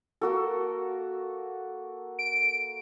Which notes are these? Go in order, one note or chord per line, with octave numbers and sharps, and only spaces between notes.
A#3 F#4 A4
D7